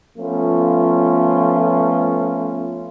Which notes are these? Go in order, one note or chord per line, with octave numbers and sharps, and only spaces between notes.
F3 A3 B3 C#4 F4